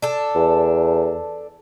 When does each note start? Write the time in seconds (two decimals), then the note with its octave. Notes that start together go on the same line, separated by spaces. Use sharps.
0.02 D4 A4
0.35 E2